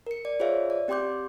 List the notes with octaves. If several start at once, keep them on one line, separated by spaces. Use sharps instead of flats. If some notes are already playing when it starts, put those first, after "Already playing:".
A#4 C#7
D5
F4 G#4 C5 C#5 E5 F5
D5
C4 G4 G5 C6 D6 G6